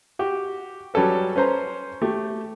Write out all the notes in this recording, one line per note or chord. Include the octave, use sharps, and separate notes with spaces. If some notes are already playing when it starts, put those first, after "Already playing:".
F#4 G4
F#3 G3 C#4 A4 B4
C#4 B4 C5 A#5
A3 G4